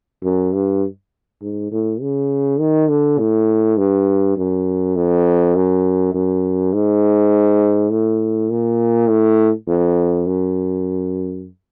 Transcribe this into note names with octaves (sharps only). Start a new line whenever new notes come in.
F#2
G2
G#2
A2
C#3
D#3
D3
A2
G2
F#2
F2
F#2
F#2
G#2
A2
A#2
A2
F2
F#2